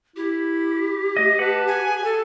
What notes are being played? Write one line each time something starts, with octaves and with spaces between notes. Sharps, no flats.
E4 G4
A3 D#5
B4 F#5 A5
G#5
A4 G#5